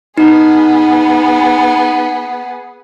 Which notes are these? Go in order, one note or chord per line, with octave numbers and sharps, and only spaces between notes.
B3 D#4 G#4